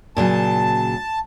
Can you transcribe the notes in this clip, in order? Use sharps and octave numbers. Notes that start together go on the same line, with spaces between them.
A#2 C#3 F#3 A5